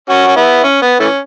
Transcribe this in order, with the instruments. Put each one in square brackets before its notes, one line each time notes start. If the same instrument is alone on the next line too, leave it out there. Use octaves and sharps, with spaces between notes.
[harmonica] C#4 F#4
C#4
B3 E4
C#4
B3
E3 A3 C#4